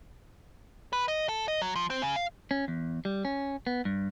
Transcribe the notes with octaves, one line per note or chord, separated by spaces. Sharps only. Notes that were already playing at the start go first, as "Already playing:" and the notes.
B4
D#5
A4
D#5
F#3
F3
C4
C#3
F5
C#4
E2
G3
C#4
B3
G2